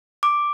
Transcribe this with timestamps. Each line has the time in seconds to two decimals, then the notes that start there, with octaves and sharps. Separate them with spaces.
0.23 D6